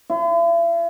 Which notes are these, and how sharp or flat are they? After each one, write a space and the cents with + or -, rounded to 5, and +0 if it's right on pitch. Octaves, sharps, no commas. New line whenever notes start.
E4 +45